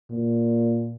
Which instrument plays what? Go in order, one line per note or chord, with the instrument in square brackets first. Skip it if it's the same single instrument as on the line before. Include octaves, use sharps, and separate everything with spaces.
[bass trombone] A#2